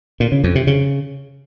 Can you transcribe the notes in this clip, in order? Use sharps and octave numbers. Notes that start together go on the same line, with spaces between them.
A#2
C#3
F2
C3
C#3